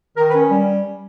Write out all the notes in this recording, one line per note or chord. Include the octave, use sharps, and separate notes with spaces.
D#3 A#4
B4
C#4
G3